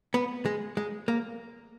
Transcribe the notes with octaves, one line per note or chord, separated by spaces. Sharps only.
B3
G#3
G#3
A#3